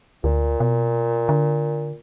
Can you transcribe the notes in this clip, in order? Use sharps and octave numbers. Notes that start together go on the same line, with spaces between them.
D2 A#2
B2
D3